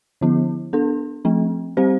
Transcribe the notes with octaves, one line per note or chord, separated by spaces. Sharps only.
D3 F3 B3 E4
B3 D4 A4
F3 A3 C4
G3 C4 G4 C5